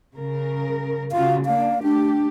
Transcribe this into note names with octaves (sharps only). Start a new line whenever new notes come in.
C#3 A#4
C#3 F4 F#4 F5
A#3 D4 F5
A3 D4 G4